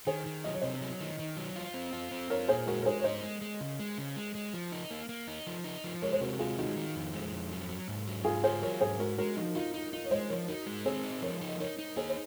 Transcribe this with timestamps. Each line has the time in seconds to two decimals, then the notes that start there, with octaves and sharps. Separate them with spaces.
0.07 D#3 G#4 C5
0.26 D#3
0.44 F#3 D#5
0.53 C#5
0.61 C3 C5 D#5
0.81 F#3
1.01 D#3
1.19 D#3
1.37 F#3
1.56 F4
1.74 C4
1.93 F4
2.11 C4
2.30 F4 A#4 C#5
2.48 A#2 G#4 C5
2.67 G#3 F#4 A#4
2.82 A#4
2.85 G#3 G#4 C5
3.00 C#5
3.04 D#4 C5 D#5
3.23 G#3
3.41 G#3
3.60 C#3
3.80 G#3
3.98 C#3
4.16 G#3
4.35 G#3
4.54 F3
4.72 D#4
4.91 A#3
5.09 A#3
5.27 D#4
5.47 F3
5.64 D#4
5.84 F3
6.02 G#3 A#4 C#5
6.13 C5
6.20 C3 F#4 A#4
6.32 F#4
6.39 G#3 F4 G#4
6.57 D#3 D#4 F#4
6.76 D#3
6.95 F2
7.14 G#3
7.32 F2
7.51 F#3
7.69 F#3
7.88 G#2
8.07 F#3
8.25 G#2 F4 G#4
8.44 F4 G#4 C5
8.62 F#3 A#4 C#5
8.81 G#2 G#4 C5
8.99 G#3 F#4 A#4
9.18 G#3 F#4 A#4
9.36 F3 D#4 F#4
9.55 D#4 F4
9.74 D#4 F4
9.92 D#4 F4
10.05 C#5
10.11 G#3 C5 D#5
10.30 F3 A#4 C#5
10.48 D#4 F#4 A#4
10.66 G#3
10.85 C4 G#4 C5
11.04 D#4
11.22 F3 A#4 C#5
11.41 D#4
11.49 D#5
11.60 D#4 A#4 C#5
11.79 D#4
11.96 A#3 G#4 C5
12.10 C5